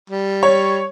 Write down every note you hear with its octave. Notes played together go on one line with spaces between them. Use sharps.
G3
C#5